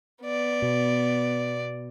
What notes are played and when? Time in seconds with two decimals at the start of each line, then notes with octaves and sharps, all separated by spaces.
0.23 B3 D5
0.62 B2